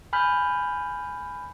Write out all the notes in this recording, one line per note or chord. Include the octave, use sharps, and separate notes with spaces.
G#5 B5 F6 G6